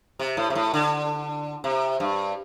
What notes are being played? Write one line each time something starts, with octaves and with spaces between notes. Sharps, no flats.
C3
A2
C3
A2
D3
C3
G2